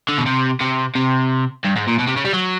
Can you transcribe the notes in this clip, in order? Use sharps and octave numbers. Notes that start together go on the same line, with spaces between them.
D3
B2
C3
C3
C3
G2
G#2
A#2
B2
C3
C#3
G3
F#3